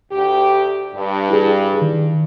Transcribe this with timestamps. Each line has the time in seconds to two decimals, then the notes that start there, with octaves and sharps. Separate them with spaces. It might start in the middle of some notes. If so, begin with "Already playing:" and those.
0.12 D2 G4
0.95 G2
1.30 E4 G#4
1.82 D#3